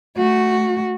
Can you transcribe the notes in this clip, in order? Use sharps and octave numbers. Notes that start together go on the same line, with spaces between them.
A3 F#4